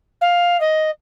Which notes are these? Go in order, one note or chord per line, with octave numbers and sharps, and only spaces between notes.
F5
D#5